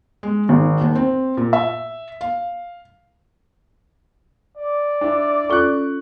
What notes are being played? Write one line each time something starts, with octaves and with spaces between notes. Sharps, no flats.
G#3
G#1
D#2
C4
A#2
E5
F5
D5
D4 E4
C#4 F4 A4 C#6 F#6